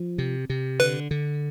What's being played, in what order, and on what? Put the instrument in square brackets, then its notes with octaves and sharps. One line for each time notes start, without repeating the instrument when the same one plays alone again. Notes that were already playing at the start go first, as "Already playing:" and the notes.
Already playing: [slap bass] F3
C3
C3
[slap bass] D3 [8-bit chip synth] B4
[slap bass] D3